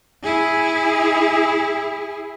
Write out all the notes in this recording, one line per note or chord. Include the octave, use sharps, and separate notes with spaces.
E4 G#4